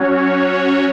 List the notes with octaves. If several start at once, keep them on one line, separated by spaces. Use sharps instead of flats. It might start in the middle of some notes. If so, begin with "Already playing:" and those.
Already playing: F#3 C#4 F#4 C#5